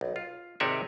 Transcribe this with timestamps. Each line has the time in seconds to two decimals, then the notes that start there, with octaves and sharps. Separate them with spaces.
0.01 B1
0.16 F4
0.60 G#1 C3 D#4 C#5 D5 E5